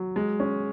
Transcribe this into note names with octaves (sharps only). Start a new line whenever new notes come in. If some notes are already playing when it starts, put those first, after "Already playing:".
Already playing: F#3
G#3
C#4